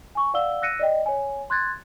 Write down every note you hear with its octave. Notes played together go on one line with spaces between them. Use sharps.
G#5 C#6
D5 F5 F#5 E6 G7
E6 F#6 A#6 C#7 D#7
D5 D#5 G5
C#5 G#5
C6 F#6 G#6 A6